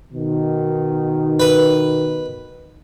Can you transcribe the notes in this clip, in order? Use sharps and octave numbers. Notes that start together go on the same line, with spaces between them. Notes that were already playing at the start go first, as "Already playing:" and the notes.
B2 D#3
B4